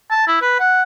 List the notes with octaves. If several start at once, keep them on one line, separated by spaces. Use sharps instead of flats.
A5
E4
B4
F#5